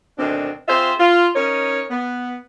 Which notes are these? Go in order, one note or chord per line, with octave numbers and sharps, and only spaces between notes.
D2 B2 D3 D#3 C4 D4
C4 F4 G#4 C5 E5
F4
C#4 D#4 A#4 C#5
B3